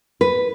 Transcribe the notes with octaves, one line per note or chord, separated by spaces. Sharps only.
B4